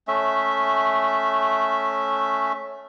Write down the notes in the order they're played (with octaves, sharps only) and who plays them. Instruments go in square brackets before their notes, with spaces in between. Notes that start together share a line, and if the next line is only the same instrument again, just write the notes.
[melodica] A3 C#4 E5